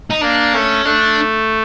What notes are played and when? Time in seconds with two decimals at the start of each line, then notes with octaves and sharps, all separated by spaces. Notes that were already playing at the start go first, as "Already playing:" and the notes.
0.10 D#4
0.21 A#3 D4
0.54 A3 C#4
0.85 A3 D4